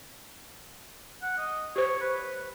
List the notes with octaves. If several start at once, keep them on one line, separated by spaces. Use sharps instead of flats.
F#5
D#5
G4 C5 C#5
B4